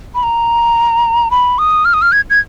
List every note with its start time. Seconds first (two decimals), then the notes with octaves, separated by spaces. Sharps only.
0.15 B5
0.23 A#5
1.31 B5
1.58 D#6
1.85 F6
1.93 D#6
2.02 F6
2.12 G#6
2.30 G#6